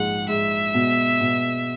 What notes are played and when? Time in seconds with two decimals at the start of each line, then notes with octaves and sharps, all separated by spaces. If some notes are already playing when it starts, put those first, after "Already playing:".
Already playing: A#1 G#2 F#5
0.28 G#2 E5
0.74 B2
1.21 B2